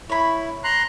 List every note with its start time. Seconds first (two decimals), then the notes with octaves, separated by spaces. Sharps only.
0.10 E4 C#5 B5
0.64 A#5 C6 F#6